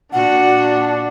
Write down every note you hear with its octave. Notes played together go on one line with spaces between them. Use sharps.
A#2 D4 F#4 F#5